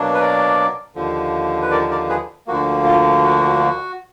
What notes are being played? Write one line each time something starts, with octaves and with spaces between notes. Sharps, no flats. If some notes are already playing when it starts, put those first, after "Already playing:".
Already playing: B2 F#3 A#3 D4
B4
A#4 D5
D#2 D3 F3
B4
A#4 D5
A#4 D5
G#4 B4
D2 D3 F3 A#3 F#4
F4
F#4